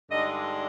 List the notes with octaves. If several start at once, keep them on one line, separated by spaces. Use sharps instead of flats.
G2 D3 G#3 D#4 D#5